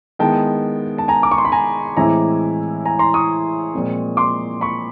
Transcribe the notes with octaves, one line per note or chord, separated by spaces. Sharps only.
D#3 G#3 B3 E4 G5 A5
A5
G#5 A#5
D6
C#6
C6
B5
G#5 A#5
A2 E3 G#3 C4 E4 G#5 A#5
G#5 A#5
A#5 C6
C#6 D#6
A#2 F3 G#3 C4
C6 D6
B5 C#6